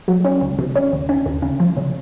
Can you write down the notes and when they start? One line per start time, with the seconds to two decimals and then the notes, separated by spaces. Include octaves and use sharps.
0.08 F#3
0.24 C#4
0.41 C#2
0.59 C3
0.75 C#4
0.93 D#2
1.09 C#4
1.26 D#2
1.42 C#3
1.60 F3
1.77 C#3